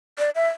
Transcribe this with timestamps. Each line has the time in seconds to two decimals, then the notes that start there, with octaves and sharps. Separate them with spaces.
0.19 D5
0.35 E5